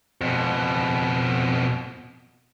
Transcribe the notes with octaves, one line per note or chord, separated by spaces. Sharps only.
F2 B2